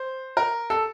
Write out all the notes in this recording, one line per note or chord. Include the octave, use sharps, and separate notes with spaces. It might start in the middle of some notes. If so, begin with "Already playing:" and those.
Already playing: C5
A#4
A4